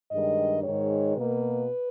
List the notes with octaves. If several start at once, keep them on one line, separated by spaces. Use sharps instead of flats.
G2 D#3 G#3 D#5
G#2 D#3 G#3 C#5
B2 A#3 B4